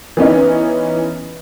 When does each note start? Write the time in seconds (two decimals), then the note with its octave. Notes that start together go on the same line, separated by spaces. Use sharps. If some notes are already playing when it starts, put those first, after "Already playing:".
0.17 E3 B3 C#4 D#4